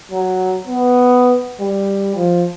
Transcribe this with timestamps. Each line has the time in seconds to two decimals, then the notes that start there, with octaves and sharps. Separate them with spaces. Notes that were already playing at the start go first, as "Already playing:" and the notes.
0.11 F#3
0.67 B3
1.60 G3
2.16 F3